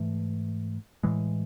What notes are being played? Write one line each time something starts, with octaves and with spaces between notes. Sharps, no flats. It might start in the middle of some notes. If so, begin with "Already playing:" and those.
Already playing: G#2 E3 A3
A2 E3 G#3